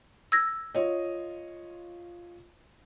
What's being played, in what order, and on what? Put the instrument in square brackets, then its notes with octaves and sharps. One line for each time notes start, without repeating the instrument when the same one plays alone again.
[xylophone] E6 G#6 A#6
[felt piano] F4 C#5 D#5